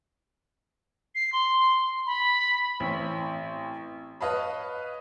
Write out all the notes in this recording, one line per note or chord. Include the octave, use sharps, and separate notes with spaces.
C7
C6
B5
A1 C4 C#5
B4 C#5 D#5 F5 A5 B5